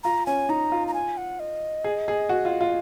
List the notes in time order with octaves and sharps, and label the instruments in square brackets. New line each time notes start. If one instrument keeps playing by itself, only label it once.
[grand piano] F4 [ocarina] A#5
[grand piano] C#4 [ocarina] G#5
[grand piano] D#4 [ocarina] A#5
[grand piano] F4
[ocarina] A#5
G#5
F#5
D#5
[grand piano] G#4
G#4
F#4
F4
F4